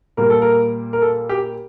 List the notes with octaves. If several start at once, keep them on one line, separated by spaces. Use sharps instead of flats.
A#2 G3 A#3 A#4
A4
A#4
A#4
A4
G4